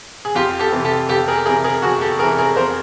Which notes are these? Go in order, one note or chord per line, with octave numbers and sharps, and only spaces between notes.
G#4
F2 F4 G4
G4 A4
C3 E3
G4 A4
F2 G4 A4
G#4 A#4
C3 E3 G#4 A#4
G#4 A#4
F2 F#4 G#4
G4 A4
C3 E3 G#4 A#4
G#4 A#4
F2 A#4 C5